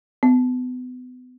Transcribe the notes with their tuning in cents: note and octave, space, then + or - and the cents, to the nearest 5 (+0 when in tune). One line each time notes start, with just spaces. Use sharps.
B3 +30